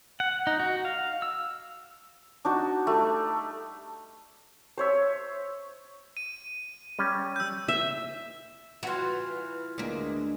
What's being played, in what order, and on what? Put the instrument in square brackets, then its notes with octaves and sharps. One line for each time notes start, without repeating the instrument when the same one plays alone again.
[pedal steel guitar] F#5
D#4
F#4
F5
E6
[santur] D4 D#4 F#4
G3 A3
C5 C#5 E5
[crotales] D#7
[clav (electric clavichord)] G3 C#4
[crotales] E6 G6
[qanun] E5
[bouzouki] E3 F4 [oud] F#4 [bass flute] B4
[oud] D2 A#3 [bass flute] G#3